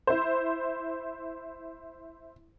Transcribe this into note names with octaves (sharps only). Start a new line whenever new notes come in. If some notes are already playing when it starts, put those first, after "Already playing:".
E4 C5